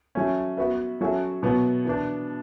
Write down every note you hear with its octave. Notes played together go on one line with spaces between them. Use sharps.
F#3 A3 C#4
B3 F#4 B4 E5
F#3 C#4 F#4 A4 E5
B2 F#3 B3 F#4
E3 B3 D4